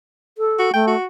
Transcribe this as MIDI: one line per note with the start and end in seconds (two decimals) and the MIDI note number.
0.38 0.70 69
0.59 0.70 66
0.73 0.95 57
0.73 0.85 79
0.87 1.06 66